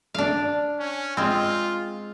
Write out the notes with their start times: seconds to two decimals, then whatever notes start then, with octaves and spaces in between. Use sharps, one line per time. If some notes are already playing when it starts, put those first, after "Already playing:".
0.14 D4 F5
0.80 C#4
1.17 G#3 C4 F4